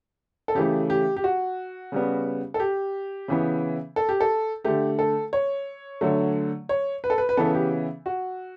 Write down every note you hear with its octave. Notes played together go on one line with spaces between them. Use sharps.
A4
C#3 E3 A3 G4
G4
G4
F#4
C#3 G3 B3
A4
G4
C#3 E3 B3
A4
G4
A4
D3 A3 G4
A4
C#5
D3 F#3 A3
C#5
B4
A4
B4
B4
C#3 E3 B3 A4
G4
F#4